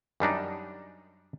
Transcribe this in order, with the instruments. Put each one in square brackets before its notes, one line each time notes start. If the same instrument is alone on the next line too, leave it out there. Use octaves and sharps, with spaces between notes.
[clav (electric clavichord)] F#2 G3 D4 D#4